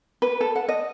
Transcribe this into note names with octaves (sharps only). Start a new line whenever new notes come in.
B4
A4
F#5
D#5